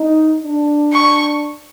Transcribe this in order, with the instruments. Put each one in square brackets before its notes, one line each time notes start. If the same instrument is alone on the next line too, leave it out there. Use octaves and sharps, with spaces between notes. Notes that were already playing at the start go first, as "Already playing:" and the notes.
Already playing: [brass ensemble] D#4
D4
[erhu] C#6